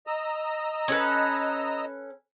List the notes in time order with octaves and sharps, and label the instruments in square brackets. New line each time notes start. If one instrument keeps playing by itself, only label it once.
[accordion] D#5 A#5 E6
[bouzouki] C#4 A4 B4